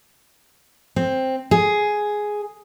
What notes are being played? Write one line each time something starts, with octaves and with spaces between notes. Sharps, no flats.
C4
G#4